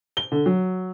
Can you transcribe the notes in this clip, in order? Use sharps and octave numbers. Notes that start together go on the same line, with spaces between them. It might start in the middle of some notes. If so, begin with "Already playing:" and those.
G7
D3
F#3